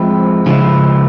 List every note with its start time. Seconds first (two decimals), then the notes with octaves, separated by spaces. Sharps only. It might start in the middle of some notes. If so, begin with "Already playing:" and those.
Already playing: F3 G#3 C4 E4
0.46 C#3 F3 G#3 E4